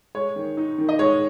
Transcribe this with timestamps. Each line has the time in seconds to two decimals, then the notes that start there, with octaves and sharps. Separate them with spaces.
0.15 G#3 C#5
0.36 D#3
0.57 D#4
0.78 D#3
0.89 D#5
0.99 G#3 C#5